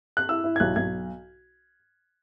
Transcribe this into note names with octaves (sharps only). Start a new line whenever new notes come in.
F#6
E4 E6
E4
G#6
B1 F#6
B1 G#6